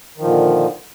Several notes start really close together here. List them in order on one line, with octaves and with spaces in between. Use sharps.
D#3 F3 A#2 D3